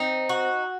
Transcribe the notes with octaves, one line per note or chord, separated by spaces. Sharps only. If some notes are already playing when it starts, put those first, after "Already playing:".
Already playing: C4 D#4
F#4